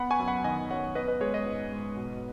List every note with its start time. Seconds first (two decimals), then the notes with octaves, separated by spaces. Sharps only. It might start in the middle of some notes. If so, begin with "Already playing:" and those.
Already playing: B3 F#5 B5
0.11 G#5 C#6
0.19 F#2
0.28 F#5 B5
0.44 D#3 D#5 G#5
0.71 F#2 C#5 F#5
0.95 B3 B4 D#5
1.08 B4 D#5
1.21 G#3 G#4 C#5
1.34 B4 D#5
1.46 G#2
1.71 G#2
1.97 B2